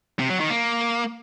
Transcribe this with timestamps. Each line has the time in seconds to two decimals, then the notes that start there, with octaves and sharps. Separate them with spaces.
0.19 C3
0.30 F#3
0.40 D#3
0.50 A#3